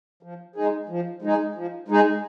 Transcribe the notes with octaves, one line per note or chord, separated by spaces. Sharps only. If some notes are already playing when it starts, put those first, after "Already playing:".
F3
G#3 D#4 G#4
F3
G#3 D#4 G#4
F3
G#3 D#4 G#4